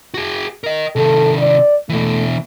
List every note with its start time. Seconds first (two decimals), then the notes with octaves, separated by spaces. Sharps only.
0.14 F#4 G#4
0.64 A#4 D#5
0.96 C3 D#3 A4
1.38 D5
1.90 B2 E3 A3